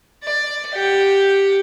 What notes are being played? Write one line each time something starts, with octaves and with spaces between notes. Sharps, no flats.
D5
G4 F#5